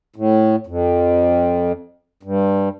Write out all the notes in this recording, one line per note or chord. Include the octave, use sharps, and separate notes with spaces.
A2
F2
G2